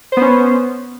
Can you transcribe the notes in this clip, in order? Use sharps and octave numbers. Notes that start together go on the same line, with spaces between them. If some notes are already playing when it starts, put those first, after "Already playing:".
B3 C#4 C5